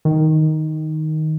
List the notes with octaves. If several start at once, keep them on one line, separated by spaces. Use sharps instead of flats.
D#3